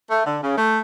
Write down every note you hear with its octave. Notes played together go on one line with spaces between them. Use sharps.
A3
D3
C#3
A3